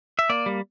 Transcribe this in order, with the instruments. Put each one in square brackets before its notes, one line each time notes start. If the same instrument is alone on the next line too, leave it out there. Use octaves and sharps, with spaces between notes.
[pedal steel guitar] E5
A#3 D5
G3